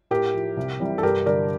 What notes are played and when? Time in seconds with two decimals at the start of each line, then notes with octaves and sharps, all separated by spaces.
0.10 A2 G4 A#4
0.34 F3
0.57 C2
0.80 C3 E3 G3
0.98 A4
1.03 G2 G4 A#4
1.26 D3 G3 A#4 D5